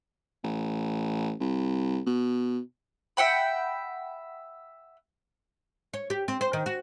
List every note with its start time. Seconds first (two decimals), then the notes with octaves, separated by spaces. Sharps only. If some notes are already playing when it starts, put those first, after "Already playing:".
0.44 A1
1.40 C2
2.06 B2
3.17 E5 F#5 G5 B5
5.93 C#5
6.10 G4
6.28 C4
6.41 C5
6.53 D#3
6.66 F#4